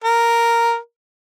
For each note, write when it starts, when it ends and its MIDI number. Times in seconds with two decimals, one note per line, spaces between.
0.04 0.77 70